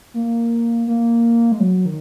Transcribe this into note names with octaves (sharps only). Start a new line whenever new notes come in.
A#3
A#3
G#3
F#3
D#3